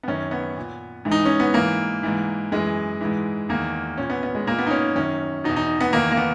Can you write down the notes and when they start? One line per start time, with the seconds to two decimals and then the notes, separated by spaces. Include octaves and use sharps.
0.03 B3
0.08 F#2 D#3 C#4
0.31 B3
0.57 A#2
1.05 G#2 E3
1.11 D#4
1.25 C#4
1.40 B3
1.54 G#2 E3 A#3
2.03 G#2 E3
2.52 F#2 E3 G#3
3.01 G#2 E3
3.49 E2 D#3 A#3
3.97 A#2 C#4
4.10 B3
4.23 B3
4.35 G#3
4.47 A#2 A#3
4.59 B3
4.66 D#4
4.71 C#4
4.96 F#2 D#3 C#4
5.44 B2 D#4
5.49 E2
5.56 D#4
5.81 B3
5.93 E2 D#3 A#3
6.12 A#3
6.17 B3